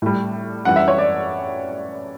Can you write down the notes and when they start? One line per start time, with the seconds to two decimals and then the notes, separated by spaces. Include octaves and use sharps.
0.02 A2 G3
0.65 F#2 E3 G3 F#5
0.76 E5
0.88 C#5
0.98 D5